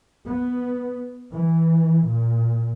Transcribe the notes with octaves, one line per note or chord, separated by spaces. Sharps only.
B3
E3
A#2